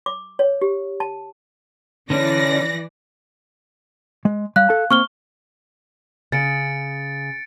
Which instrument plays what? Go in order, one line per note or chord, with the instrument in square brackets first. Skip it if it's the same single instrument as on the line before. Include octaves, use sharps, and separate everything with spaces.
[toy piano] D6
C#5
G4
A5
[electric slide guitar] D3 C#4 [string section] E3 D5 A#6
[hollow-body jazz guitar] G#3
[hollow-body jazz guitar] G3 [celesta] F5 F#6
[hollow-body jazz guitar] A4 C#5 A5
[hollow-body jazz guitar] A#3 C4 [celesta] C#6 F6 G7
[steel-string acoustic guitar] C#3 [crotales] A6 C#7 D7